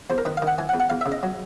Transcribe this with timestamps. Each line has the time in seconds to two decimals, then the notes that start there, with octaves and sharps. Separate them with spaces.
0.10 E2 C5
0.18 A#4
0.25 D#3 B4
0.37 F5
0.42 D#3 F#5
0.58 E3 G#5
0.69 F#5
0.74 E2
0.80 F#5
0.90 E2 F5
1.01 E5
1.06 C#3
1.12 D#5
1.23 F#3